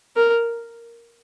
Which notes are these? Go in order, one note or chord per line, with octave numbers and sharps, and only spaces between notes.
A#4